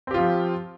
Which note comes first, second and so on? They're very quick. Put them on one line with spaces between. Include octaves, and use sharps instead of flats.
C4 G4 F4 F3